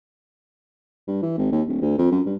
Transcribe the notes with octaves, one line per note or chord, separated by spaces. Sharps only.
G2
E3
G#1
D#2
D1
D2
F2
F#2
G2